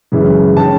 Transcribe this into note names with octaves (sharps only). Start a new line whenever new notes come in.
F#2 C#3 E3 G#3
D#3 G#3 C#4 A5